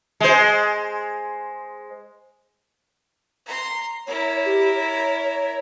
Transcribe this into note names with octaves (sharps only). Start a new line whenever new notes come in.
G#3 C5
A#5 C6
E4 A#4 C#5
G4
C#5